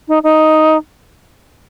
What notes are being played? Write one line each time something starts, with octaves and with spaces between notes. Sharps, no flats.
D#4
D#4